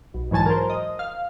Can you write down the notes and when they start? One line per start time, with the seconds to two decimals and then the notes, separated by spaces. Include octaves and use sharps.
0.14 B1
0.31 G#2 E3 F#3 G#5 A5
0.46 A#4 C5
0.70 D#5
0.99 F5